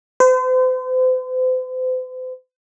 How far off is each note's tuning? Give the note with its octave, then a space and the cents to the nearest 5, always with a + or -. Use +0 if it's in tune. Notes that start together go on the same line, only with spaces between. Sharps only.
C5 -40